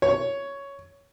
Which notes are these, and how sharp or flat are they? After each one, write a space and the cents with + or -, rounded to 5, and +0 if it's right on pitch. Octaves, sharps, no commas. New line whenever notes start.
C#5 +5